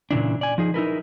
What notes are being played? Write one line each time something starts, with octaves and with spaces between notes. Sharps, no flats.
A#2 C#3 E3 D4
D5 G#5
F3 D#4 G#4
D#4 E4 A#4 B4